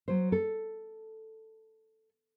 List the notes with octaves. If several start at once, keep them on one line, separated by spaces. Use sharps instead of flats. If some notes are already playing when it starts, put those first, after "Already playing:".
F#3 C5
A4